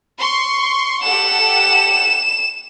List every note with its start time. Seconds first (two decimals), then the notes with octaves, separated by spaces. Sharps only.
0.20 C6 C#6
1.03 G4 A4 F#5 E7